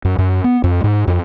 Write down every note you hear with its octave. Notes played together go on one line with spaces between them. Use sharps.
F#2
F#2
B3
F2
G#2
F2